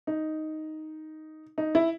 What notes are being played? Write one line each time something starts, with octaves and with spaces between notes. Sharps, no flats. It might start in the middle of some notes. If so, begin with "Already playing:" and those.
D#4
D#4
E4